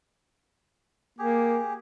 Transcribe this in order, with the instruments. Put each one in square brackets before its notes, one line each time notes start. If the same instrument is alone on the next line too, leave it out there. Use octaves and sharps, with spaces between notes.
[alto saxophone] A#3 [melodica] G4 G#4